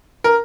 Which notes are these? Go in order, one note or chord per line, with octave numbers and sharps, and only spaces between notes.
A#4